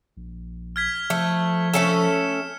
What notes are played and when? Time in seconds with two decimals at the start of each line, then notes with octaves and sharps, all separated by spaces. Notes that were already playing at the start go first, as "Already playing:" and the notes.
0.17 A#1
0.76 F6 G#6 B6
1.10 F3 A3
1.74 A3 C#4 A4 C#7 E7